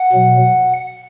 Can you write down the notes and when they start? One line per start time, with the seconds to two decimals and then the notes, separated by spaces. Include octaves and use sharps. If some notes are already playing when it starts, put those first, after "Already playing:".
Already playing: F#5
0.12 B2 F#3